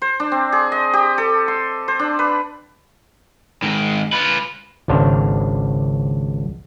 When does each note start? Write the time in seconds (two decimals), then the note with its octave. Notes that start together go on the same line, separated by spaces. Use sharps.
0.02 C5
0.20 D4
0.32 C4
0.52 G#4
0.72 D#5
0.93 G4
1.18 A4
1.48 C6
1.88 C5
1.99 D4
2.19 B4
3.62 G#2 D#3
4.13 F4 B4
4.88 G#1 C#2 D4 C5 F5